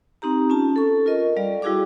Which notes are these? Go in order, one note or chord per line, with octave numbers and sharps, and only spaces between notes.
C4 D#4 G4 A#5
C#4 F4 A5
A4 C#6
F4 A#4 D#5
G3 D5 F5
G3 E4 F#4 G#4 F5 D6